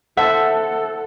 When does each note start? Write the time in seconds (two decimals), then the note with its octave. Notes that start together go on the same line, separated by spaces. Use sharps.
0.17 E4 A4 C5 E5 F#5 A5 E6